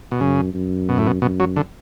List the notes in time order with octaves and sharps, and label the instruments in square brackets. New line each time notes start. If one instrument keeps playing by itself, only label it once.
[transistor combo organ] B2
[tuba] F#2 [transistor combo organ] C#3
[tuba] F#2
[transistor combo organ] B2
A2
B2
[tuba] F#2 [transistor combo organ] B2
[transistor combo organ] F#3
D3